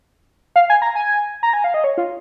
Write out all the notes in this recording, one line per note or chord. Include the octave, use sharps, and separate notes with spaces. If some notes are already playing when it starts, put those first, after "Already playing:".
F5
G#5
A#5
G#5
A#5
G#5
F5
D#5
C#5
F4